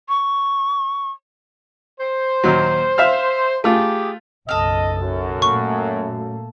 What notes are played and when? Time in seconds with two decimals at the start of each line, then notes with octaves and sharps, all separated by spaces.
0.09 C#6
2.00 C5
2.44 D#2 A#2 F#3
2.98 E5 F5 F6
3.64 A3 F4 G4 G#4
4.49 F#1 B1 A4 D#5 F6
4.99 F#2
5.42 A#2 A3 A#3 C#6